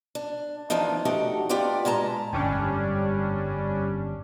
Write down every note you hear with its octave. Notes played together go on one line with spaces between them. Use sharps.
D4
E3 F3 B3 D4 D#4
A3 D4 D#4 F#4 G4 F#5
F4 G4 B4 D5 F#5
A#2 G#3 A5 A#5
G1 F2 G#2 G3 C#4 D4